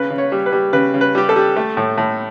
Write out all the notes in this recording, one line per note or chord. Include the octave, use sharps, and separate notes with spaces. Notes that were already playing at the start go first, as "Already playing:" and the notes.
Already playing: C#3 B4
C#3
C#5
G3
B4
G3
C#3 B4
C#3
B4
G3 G4
A4
G3
A3
A2
A2